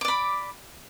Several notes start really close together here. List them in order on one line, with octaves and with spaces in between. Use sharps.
D6 D5 B5